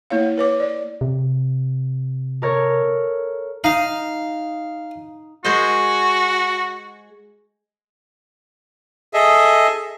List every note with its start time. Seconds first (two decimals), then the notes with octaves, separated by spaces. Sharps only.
0.10 A#3 E4 C#5 F5
0.38 B4 C#5 D6
0.60 D5
1.01 C3
2.42 A4 A#4 C#5
3.64 D#4 F5
5.44 G#3 F#4 C5 D#5
9.14 G#4 A4 D#5 E5